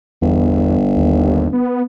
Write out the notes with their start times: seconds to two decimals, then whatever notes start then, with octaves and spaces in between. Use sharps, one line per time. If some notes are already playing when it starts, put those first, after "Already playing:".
0.22 G1 E2
0.96 D#2
1.53 B3